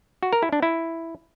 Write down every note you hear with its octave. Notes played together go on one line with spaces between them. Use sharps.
F#4
A#4
E4
D4
E4